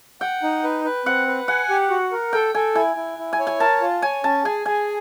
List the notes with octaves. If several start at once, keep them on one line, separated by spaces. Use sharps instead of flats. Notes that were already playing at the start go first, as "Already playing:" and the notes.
F#5 G5
D#4
B4
B4
C4 F#5
B4
F#5 G#5
G4
F#4
A#4
A4 G5
A4 G#5
E4 G#5
E4
E4
G#5
C#5
G#5
A#4 A5
F4
C#5 G#5
C#4 A5
G#4 G#5
G#4 G#5